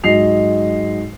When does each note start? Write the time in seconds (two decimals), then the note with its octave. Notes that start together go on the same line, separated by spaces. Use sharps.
0.04 G#2 F#3 D#5 C7 F7